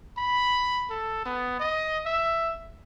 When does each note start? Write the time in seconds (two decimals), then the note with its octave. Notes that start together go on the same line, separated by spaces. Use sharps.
0.17 B5
0.90 A4
1.25 B3
1.60 D#5
2.06 E5